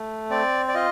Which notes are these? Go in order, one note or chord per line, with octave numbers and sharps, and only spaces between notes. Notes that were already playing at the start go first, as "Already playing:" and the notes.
Already playing: A3
C4 D5
D5
F4 D#5